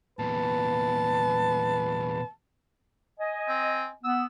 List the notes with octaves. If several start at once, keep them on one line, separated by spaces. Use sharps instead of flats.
E2 A#2 B4 A5
D#5 G#5
C4
B3 E6